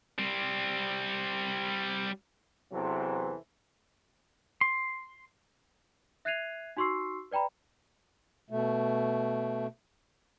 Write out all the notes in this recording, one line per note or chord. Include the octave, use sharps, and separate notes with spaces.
G3 C4
E2 C3 E3 F#3 A4 C5
C6
E5 F#6 G#6 C7 D#7 F7
D#4 F#4 C6 C#6 E6 C7
B4 D5 G5 A#5 B5
B2 A3